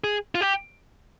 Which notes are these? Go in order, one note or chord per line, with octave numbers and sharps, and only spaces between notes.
G#4
F4
G4